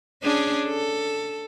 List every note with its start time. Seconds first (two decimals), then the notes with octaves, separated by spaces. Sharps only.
0.23 C#4 D4 G#4
0.67 A4